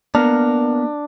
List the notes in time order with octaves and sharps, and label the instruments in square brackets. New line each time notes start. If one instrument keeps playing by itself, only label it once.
[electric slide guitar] A#3 B3 A#4 [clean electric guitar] D4